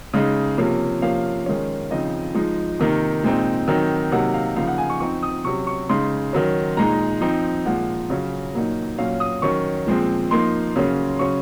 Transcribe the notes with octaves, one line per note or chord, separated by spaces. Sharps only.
C#3 G#3 D#4
C3 F3 A#3 C#4
C3 F3 A#3 C#4 F5
D#3 G#3 C#4
C#3 F3 C4 D#4 D#5
F3 G#3 D#4
C3 D#3 A#3 D#4
A#2 G#3 C4 D#4
D#3 F#3 C4 D#4
C3 F#3 A#3 D#4 F#5
F5
C#3 F3 A#3 D#4 F5
F#5
G#5
C#6
F3 C4 D#4 C#6
D#6
C3 F#3 C#4 C#6
C#6
C#3 G#3 D#4 C6
D#3 F#3 C#4
A#2 G#3 D#4 A#5
F3 C4 D#4
A#2 F3 G#3 F#5
C#3 F#3 C#4 C#5
A#2 F#3 A#3 D#4
A#2 F#3 C#4 F5
D#6
D#3 F#3 C#4 C#6
A#2 F3 G#3 C4
F3 A#3 D#4 C6
C#3 F#3 A#3 C#4
C#3 F#3 C#4 C#6